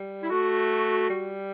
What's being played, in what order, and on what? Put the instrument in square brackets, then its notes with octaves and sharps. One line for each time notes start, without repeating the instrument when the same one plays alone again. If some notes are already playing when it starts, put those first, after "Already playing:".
Already playing: [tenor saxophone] G3
[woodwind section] E4
[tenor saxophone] A3 [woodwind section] F#4
[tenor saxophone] G3